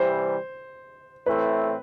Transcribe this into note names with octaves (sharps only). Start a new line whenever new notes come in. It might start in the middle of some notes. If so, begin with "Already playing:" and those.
Already playing: C3 E3 G3 C5
A2 E3 A3 C4 E4 B4